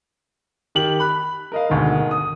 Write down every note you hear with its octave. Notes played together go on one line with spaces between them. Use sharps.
D#3 G4 F#7
B5 F#6
A#4 D#5 F5
D2 G#2 B2 D#3
D#3
D#6